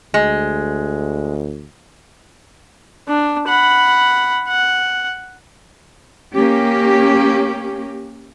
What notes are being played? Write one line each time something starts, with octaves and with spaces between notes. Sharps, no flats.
D2 G#3
D4
F#5 B5
F#5
A#3 C#4 G4